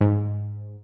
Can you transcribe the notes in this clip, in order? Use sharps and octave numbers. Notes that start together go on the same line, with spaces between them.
G#2